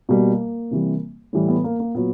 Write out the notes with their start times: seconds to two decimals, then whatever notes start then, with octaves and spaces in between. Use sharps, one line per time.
0.09 B2 G3 A#3
0.71 C3 E3 G3
1.33 A2 E3 G3
1.48 B3
1.64 A#3
1.80 A#3
1.95 A#2 F#3 B3